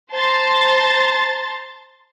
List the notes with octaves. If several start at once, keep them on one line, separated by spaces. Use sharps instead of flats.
C5 A5 A#5 C6 A6